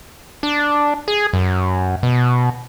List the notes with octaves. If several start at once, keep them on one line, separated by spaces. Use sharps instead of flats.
D4
G#4
F#2
B2